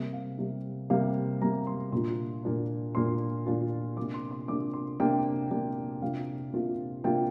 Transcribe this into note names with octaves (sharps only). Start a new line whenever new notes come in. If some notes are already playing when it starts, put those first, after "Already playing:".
Already playing: C3 G3 A#3
F5
C3 G3 A#3
C3 G3 A#3 F5
C3 G3 A#3 A#5
C6
A#2 A#3 D4 F4 C6
A#2 A#3 D4 F4
A#2 A#3 D4 F4 C6
A#2 A#3 D4 F4
C3 A#3 D4 D6
C6
C6
C3 A#3 D4 D6
C6
C3 A#3 D4 G5
C3 A#3 D4
C3 A#3 D4 F4 F5
C3 A#3 D4 F4
C3 A#3 D4 F4 G5